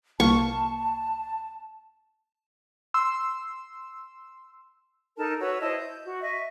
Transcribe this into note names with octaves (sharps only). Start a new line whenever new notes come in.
C2 A#3 A5 C#6 F6
C6 E6
D#4 A4 A#4 A5
F#4 B4 C#5 E6
E4 C5 D#5 A5
G6
F#4
D#5 E5 C#6